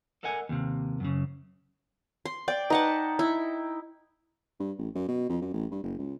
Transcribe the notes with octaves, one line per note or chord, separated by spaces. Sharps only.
A4 A#4 D#5 F#5 G#5
D#2 C3
F#2 C#3
C6
D5 G5
D#4 B4 F#5 A5
E4
G2
A1
F#2
B2
F2
F#2
A1
G2
F#1
C#2